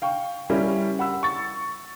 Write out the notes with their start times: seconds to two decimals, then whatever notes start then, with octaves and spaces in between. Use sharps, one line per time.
0.02 F5 G5 C#6
0.50 G3 C#4 E4 A#4
0.99 F#5 B5 E6
1.23 C#6 A6